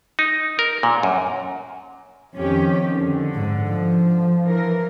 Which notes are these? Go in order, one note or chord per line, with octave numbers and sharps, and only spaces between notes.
D#4
A#4
A#2
F#2
F2 D#3 C#4 G4
D3
G#2
F3
E3 A#4